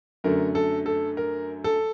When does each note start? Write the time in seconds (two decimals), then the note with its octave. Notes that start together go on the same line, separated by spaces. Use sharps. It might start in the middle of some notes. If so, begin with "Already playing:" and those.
0.24 F#2 D3 A3 A#4
0.55 A4
0.86 A4
1.17 A#4
1.64 A4